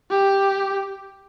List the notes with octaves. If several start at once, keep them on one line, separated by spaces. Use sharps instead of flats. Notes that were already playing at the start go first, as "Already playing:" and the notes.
G4